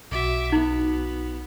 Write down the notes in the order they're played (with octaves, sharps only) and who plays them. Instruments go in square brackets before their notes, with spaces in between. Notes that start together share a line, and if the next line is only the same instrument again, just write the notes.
[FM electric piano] B1 F#4 [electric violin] E5 D6
[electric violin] B3 [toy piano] D#4